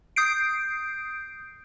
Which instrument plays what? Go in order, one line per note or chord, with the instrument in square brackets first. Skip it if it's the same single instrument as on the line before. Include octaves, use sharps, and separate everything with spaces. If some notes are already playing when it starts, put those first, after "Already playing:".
[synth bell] D#6 G6 C7 D7